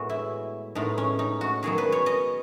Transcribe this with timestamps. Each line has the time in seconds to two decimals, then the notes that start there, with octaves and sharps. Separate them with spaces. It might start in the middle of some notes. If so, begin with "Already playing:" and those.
Already playing: A2 G#3 B3 F#4
0.09 E4
0.75 A2 G#3 B3 D#4
0.98 C#4
1.19 D#4
1.41 F#4
1.63 D#3 F#3 B3 G#4
1.78 B4
1.92 C#5
2.06 D#5